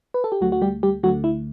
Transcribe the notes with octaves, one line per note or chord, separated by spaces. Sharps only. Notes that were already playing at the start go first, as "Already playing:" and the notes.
B4
A4
G4
D2 D3 F#3 A3 F#4
F#4
G3 G4
G3 G4
D2 D3 F#3 A3 F#4
E4